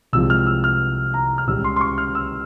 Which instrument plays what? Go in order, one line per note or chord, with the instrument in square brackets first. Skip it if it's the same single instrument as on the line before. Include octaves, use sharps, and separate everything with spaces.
[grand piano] C2 C3 F3 G#3 E6
F6
E6
F6
A#5
F6
C#2 C#3 G3 E6
C6
C6
C#6
F6
E6